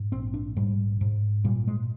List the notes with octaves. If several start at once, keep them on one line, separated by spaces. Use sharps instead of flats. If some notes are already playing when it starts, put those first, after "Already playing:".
Already playing: G#2
A#1 C4
D4
G#2 G3
G#2
A#2 G3
G#3